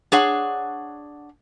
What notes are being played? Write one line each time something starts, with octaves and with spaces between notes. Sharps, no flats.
D4 G#4 C#5 F#5